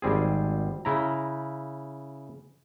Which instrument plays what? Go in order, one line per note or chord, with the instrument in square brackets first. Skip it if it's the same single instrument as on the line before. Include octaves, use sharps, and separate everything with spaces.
[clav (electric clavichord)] G#1 G3 C4 G#4
C#3 E4 A#5